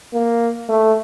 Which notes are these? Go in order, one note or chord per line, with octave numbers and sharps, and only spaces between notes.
A#3
A3